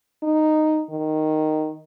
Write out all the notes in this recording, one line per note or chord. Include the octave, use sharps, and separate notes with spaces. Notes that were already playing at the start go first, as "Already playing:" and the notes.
D#4
D#3